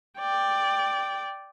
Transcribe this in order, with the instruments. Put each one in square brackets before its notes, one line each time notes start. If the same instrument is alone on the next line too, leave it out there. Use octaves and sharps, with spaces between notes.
[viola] D5 G5